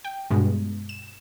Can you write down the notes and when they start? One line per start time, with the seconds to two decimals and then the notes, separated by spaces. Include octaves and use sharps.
0.05 G5
0.31 G2 B2 G#3
0.89 E7